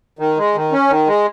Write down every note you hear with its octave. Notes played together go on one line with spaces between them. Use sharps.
D#3
G#3
D#3
C#4
D#3
G#3